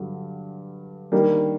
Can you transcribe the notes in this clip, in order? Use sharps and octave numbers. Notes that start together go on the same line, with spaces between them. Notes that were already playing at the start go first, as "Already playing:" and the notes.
Already playing: G2 D3 F#3
D#3 G3 A#3 D4